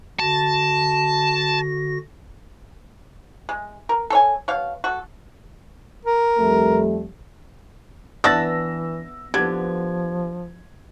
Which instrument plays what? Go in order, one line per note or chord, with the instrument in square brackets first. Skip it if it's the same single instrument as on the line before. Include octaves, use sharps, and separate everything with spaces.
[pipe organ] D3 F#4 A#6 [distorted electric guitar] A5
[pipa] G#3
A#4
A4 C#5 G#5
B2 C#5 F5
F#4 A4
[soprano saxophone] A#4
[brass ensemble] F2 G3 A3
[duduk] E3 [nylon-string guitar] B3 E5 [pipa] D4 F#5 A5 [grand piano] E6 A#6
[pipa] D3 [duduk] F3 [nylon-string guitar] B3 G4 [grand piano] G#6